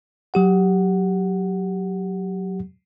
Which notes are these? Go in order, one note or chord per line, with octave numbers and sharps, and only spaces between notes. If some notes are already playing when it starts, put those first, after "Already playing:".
F#3 G4 F#5